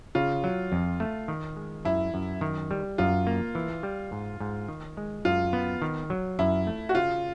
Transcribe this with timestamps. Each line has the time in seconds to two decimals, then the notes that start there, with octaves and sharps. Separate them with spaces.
0.15 C#3 F4
0.44 F#3
0.72 F2
1.00 A3
1.28 D#3
1.56 G#3
1.85 F#2 E4
2.14 F#2
2.41 D#3
2.71 G3
2.98 F#2 F4
3.27 A#3
3.55 E3
3.83 G3
4.12 G#2
4.40 G#2
4.68 D#3
4.97 G#3
5.25 F#2 F4
5.53 B3
5.82 D#3
6.10 F#3
6.39 F#2 E4
6.67 A3
6.89 F#4
6.95 C#3 F4